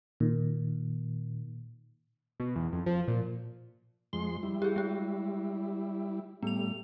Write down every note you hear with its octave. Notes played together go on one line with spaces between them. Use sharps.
A#2 D#3
B2
E2
F2
F3
A#2
F2 G#3 C6 G7
G3 E4
G4 G#4
G#3 G4
A2 G3 B3 F7